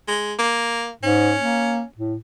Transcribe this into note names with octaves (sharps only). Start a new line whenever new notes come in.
G#3
A#3
G#2 C#4
A#3
A2